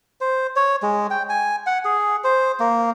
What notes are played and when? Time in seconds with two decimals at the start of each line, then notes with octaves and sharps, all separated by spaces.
0.21 C5
0.56 C#5
0.83 G#3
1.11 G5
1.29 G#5
1.66 F#5
1.85 G#4
2.24 C5
2.60 A#3